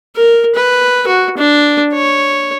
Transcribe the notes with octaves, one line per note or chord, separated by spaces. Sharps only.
A#4
B4
F#4
D4
C#5